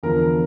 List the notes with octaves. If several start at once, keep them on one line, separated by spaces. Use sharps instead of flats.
E2 D3 F3 A#4